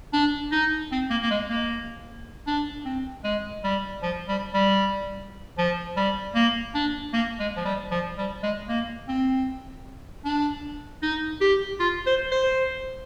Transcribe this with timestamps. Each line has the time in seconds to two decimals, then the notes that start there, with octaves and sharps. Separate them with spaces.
0.13 D4
0.52 D#4
0.92 C4
1.10 A#3
1.23 A#3
1.31 G#3
1.50 A#3
2.47 D4
2.85 C4
3.24 G#3
3.64 G3
4.03 F3
4.29 G3
4.54 G3
5.58 F3
5.97 G3
6.35 A#3
6.75 D4
7.13 A#3
7.40 G#3
7.57 F3
7.65 G3
7.91 F3
8.18 G3
8.43 G#3
8.69 A#3
9.08 C4
10.25 D4
11.03 D#4
11.41 G4
11.80 F4
12.06 C5
12.32 C5